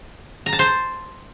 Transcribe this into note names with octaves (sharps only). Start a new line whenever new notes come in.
A#5
A5
C5